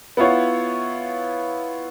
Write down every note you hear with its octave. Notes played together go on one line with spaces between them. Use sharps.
B3 E4 F4 C#5